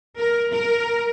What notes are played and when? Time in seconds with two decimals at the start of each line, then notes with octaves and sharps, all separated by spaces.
0.18 A#4
0.52 A#4